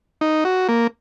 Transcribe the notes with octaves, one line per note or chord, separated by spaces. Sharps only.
D#4
F#4
A#3